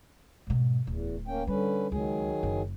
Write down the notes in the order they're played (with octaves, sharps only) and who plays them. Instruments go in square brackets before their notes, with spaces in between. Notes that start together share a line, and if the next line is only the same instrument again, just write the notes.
[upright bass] G#2 B2
[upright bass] D1 [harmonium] E2
[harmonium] A#3 C#4 G5
[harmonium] D3 C#4 B4 [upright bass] G3
[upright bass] C#2 [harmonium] D#3 F#3 G#4
[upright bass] F#1 C#3